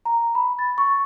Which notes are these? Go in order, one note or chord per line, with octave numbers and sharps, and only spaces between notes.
A#5
B5
A6
C#6